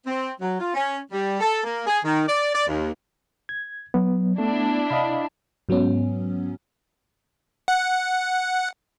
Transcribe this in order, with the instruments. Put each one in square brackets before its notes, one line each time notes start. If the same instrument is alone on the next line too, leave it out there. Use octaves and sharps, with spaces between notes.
[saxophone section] C4
F#3
F4
C#4
G3
A4
A#3
G#4
D#3
D5
D5
D#2
[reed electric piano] G#6
[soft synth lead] F#3 [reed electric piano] B3
[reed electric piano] A3 [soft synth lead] B3 [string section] D4 E4
[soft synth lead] C3 [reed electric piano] D#5 F5 B5
[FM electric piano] G#2 F#3 B3 C#4
[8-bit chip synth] F#5